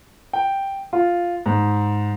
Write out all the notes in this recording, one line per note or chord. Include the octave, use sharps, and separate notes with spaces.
G5
F4
G#2